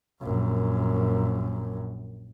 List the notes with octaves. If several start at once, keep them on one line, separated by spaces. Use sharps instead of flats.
A#1 F#2